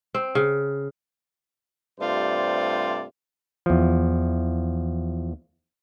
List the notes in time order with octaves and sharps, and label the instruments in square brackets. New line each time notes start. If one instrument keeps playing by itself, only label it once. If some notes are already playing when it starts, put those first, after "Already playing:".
[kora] C4
C#3
[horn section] G2 C3 A3 F4 C5 D5
[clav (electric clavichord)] E2 F3